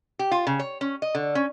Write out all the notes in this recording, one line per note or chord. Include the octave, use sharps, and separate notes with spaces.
G4
F4
C#3
C#5
C#4
D#5
D3
C#4